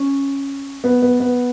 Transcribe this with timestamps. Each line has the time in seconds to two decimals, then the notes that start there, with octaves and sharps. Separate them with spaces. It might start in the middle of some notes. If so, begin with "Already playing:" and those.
Already playing: C#4
0.84 B3
1.02 B3
1.20 B3